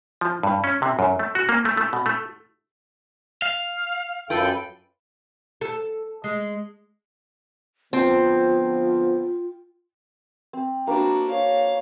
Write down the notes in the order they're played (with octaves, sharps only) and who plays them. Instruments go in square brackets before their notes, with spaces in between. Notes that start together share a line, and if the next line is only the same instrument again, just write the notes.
[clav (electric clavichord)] F3
G2
C#4
C3
F#2
A3
F#4
A#3
A3
A3
B2
A3
[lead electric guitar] F5
[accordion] F#2 A4 G5 [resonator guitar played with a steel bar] F4 B4
[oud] A4
G#3
[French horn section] D3 F3 B3 [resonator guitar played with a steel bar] C4 [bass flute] F4
[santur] C4
[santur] A#3 B4 C5 [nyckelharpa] D4 F#4
[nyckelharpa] C#5 F5